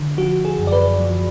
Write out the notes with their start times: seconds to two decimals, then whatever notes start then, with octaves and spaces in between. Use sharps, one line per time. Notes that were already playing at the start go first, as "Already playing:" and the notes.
Already playing: D3
0.18 F3 F#4
0.45 G#4
0.59 F#2
0.67 D5
0.72 B4
1.00 F3